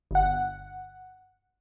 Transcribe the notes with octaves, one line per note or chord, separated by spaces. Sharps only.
G1 F#5